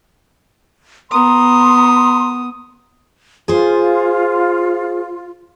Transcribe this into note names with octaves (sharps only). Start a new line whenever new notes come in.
B3 A#5 C6 D#6
F4 G#4 C5